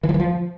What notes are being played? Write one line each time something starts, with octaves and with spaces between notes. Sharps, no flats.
E3
F3
E3
F3